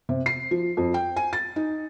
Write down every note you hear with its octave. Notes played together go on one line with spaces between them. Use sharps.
C3
C7
F3
F2
G5
G#5
A6
D#4